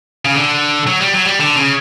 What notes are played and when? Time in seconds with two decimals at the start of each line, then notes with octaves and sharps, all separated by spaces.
0.25 C#3
0.35 D3
0.87 F#3
1.01 G3
1.13 F#3
1.25 G3
1.39 D3
1.56 C#3